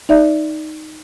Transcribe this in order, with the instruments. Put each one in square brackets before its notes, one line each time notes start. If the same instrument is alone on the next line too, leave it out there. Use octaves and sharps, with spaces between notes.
[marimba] D#4 D5 E5